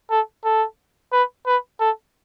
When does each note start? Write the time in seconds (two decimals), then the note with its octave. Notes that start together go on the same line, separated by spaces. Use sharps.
0.10 A4
0.44 A4
1.13 B4
1.47 B4
1.80 A4